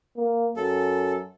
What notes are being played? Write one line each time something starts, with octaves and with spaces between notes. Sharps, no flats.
A#3
F#2 A4